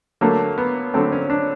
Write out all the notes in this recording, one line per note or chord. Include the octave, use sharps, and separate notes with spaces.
D3 F#3 A3 A#3
B3
D3 F#3 A3 C4
C#4
D4